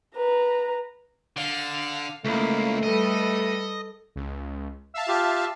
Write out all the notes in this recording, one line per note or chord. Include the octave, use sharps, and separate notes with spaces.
B4 A#5
D3 F5
C#2 A3 A#3 E4
G3 A4 B4 D#5
C#2
E5 F5 A5
F4 G4